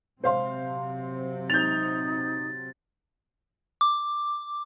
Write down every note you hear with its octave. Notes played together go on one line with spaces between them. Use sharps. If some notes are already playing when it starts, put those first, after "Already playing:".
C3 F#3 C4 C5 F5 C6
D#4 G6 A6 F7
D6